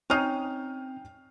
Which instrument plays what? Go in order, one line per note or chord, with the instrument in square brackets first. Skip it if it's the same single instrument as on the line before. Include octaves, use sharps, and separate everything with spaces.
[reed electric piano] C4 [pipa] C#4 D#4 [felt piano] G5 F6 C7